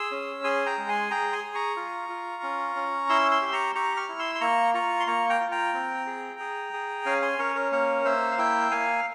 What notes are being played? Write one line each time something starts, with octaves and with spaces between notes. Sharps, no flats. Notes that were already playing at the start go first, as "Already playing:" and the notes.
Already playing: G#4 C6 E6
C#4
G#4 G#5 C6
G5 A#5
G#3
G#5 C6
G#4 G5 A#5
G#5 C6
G#4
A#5 C#6
F4
F4
C#4
C#4
E4 C6 E6
C6 E6
G4
A#5 C#6
G4 A#5 C#6
C#6 F6
E4
C6 E6
C6
A#3 A#5 C#6
F4 A#5 C#6
C6
A#3 A#5 C#6
G5 A#5
F4
G5 A#5
C4
G#4
G#4
G#4
C#4 F5 G#5
G#5 C6
C#4 A#4 C#5
A#4
A#3 A#4 C#5
A#3 C5 E5
F5
E4 E5 G5
A#3 F5 G#5